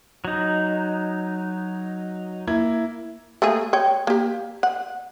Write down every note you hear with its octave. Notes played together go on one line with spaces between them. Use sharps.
F#3 D#4
A#3 E4 G#6
A3 A#3 G#4
C#5 G5
A#3 G4
F#5